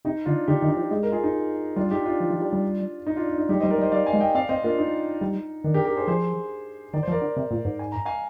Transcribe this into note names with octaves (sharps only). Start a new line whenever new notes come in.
C3 D#4
D3 D4 F4
D3 D#4 G4
D#3
D#4
F3
G#3
A#4
F4 G#4
D#4
G3 D4 F4
D#4 G4
D4 F4
F3
F3
G3
G3
D#4
D4 F4
D4
D#4
G3 D#4 G4
G3 C5 D#5
A#4 D5
G3
C5 D#5
G3 D5 F5
F5 G#5
G#3
D#5 G5
C4 D5 F5
C4 C5 D#5
A#3 D4 F4
D#4
G3
D#3 D4
G4 A#4
G4 A#4
G#4 C5
F3 G#4 C5
D#3 D5
C5
F3
A#4 D5
D3
C3
A#2
G#2
G#5
A#5
F5 G#5